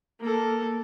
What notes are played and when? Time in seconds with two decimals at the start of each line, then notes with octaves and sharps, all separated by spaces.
0.20 A#3 A4